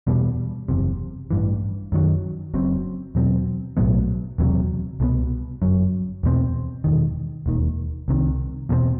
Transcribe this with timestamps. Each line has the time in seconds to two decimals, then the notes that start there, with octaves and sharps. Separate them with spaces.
0.07 E2 B2 G3
0.68 F#1 E2 C3
1.31 A1 G2 E3
1.92 F#2 D#3 F#3
2.54 F#1 F#2 F#3 C4
3.15 E2 B2 F#3 C4
3.77 B1 A2 F#3 B3
4.38 E1 E2 C3 F#3
5.00 C2 B2 G3 B3
5.62 G1 F#2 F#3
6.23 E2 B2 F#3 C4
6.84 E1 E2 D#3
7.46 E1 D#2 D#3
8.08 C2 C3 D#3
8.69 E2 B2 G3 C4